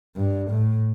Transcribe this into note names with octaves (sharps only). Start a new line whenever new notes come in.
G2
A2